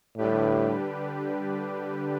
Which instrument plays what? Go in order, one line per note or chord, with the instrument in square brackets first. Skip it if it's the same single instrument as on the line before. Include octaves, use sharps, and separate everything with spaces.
[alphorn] A2 [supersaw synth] D3 G3 D4 G4 B4